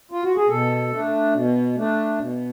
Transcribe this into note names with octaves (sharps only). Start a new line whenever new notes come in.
F4
F#4
G#4
B2 A4
A3 D4
B2
A3 D4
B2